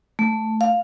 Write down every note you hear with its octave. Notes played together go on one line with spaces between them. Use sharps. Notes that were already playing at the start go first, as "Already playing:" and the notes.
A3
F5